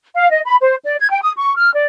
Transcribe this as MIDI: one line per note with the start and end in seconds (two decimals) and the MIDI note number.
0.14 0.30 77
0.30 0.40 75
0.45 0.55 83
0.61 0.75 72
0.85 0.95 74
1.00 1.10 92
1.11 1.21 79
1.22 1.32 87
1.38 1.56 85
1.57 1.71 89
1.74 1.85 74